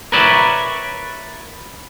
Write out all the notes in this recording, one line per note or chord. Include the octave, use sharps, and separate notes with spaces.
A#4 B4 C#5 D5 E5